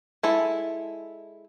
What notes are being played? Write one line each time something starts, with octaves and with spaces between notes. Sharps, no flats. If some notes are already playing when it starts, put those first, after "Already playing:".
G#3 E4 A4